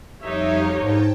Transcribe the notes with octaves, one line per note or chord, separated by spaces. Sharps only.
F2 G3 D#4 G4 C#5 E5 F5
G#2 D3 F3 A#3 G5 A5